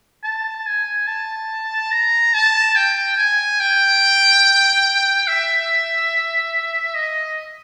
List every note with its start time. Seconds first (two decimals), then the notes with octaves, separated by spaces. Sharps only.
0.24 A5
0.66 G#5
1.07 A5
1.92 A#5
2.34 A5
2.76 G5
3.17 G#5
3.60 G5
5.28 E5
6.95 D#5